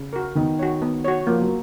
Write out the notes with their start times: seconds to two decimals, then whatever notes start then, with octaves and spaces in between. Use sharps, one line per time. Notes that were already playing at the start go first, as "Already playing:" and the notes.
Already playing: C#3
0.13 F#4 A#4
0.35 D#3 B3
0.59 F#4 C#5
0.82 B3
1.05 F#4 C#5
1.27 F3 A#3
1.41 F#3